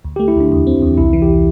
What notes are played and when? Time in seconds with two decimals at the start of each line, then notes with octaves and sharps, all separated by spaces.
0.05 D2
0.16 G4
0.20 A3
0.28 E4
0.36 D2 D4
0.52 E2
0.67 C4
0.82 E2
0.98 C2 E4
1.13 E3
1.22 G4